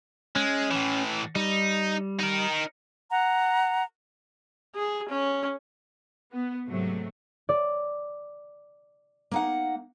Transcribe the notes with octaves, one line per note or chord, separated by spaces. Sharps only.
G#3 C#4
A2 E3
G3 D#4
D#4 A#4
F#5 A#5
G#4
C#4
B3
G#2 C3 F#3 A3
D5
A#3 D#4 F#5